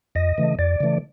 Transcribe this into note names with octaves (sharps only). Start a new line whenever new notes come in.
F2 D#5
C#3 E3 A3
F2 D5
C#3 E3 A3